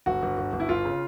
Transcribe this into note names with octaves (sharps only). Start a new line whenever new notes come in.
G1 F#4
G1
G1
G1
E4
G1 F4
C#3